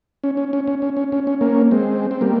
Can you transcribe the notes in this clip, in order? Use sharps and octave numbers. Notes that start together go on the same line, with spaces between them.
C#4
C#4
C#4
C#4
C#4
C#4
C#4
C#4
A#3 C#4
G#3 C4
C4
G3 A#3